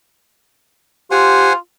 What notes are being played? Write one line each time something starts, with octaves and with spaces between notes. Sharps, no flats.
F4 G4 C5 F#5 G#5